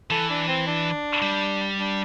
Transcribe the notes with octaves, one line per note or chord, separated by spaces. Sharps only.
E3 A4
D4
C4
D4
G3
D4